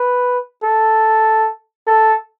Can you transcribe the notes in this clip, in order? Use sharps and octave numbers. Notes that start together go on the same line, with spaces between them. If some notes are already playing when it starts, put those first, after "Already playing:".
Already playing: B4
A4
A4